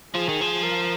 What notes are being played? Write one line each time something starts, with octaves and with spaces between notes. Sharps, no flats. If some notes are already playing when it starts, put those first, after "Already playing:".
F3 G#4
D#3
F3
A#4